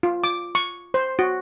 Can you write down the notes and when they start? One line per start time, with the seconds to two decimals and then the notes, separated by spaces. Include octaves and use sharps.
0.03 F4
0.24 D6
0.55 C#6
0.94 C5
1.19 F#4